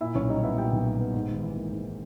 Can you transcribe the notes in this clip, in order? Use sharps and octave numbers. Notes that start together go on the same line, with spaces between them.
A#2 E4 E5
B1 C#4 C#5
G3 D#4 D#5
B3 E4 E5
A#2 G4 G5
B1
G3
B3
G#2
G#1
E3
A#3
G#2